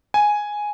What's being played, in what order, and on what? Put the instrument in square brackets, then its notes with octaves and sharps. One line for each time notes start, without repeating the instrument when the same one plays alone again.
[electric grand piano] G#5